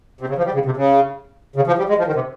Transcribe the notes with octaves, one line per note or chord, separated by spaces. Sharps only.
C3
C#3
F3
G3
C#3
C3
C#3
C#3
F3
G3
G#3
F3
D#3
C3